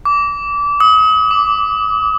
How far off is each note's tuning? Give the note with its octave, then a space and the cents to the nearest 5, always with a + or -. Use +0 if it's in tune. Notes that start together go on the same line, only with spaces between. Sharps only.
D6 -25
D#6 +35
D6 -10